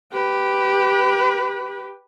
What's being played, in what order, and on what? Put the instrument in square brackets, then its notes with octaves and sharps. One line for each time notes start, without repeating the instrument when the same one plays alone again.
[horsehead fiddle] G4 B4